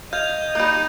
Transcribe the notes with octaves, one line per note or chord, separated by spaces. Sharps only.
D#5 F5 G6 G#6 F7
G3 A#3 D#4